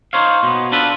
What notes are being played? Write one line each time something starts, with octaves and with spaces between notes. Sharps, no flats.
D#4 C5 C#5 F5
B2 B3
D4 F4 A4 B4